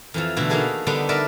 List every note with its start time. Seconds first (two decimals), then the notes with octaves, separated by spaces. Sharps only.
0.14 F2 E3 F3
0.36 B2 D3 E3 A3 E4 F#4
0.49 A#3 D#4 F#4 G#4 A4 B4
0.87 D3 G3 B3 D4 D#4
1.09 A#4 B4 D5 E5 F#5 A5